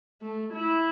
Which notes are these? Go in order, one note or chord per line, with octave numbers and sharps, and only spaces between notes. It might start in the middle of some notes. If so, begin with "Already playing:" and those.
A3
E4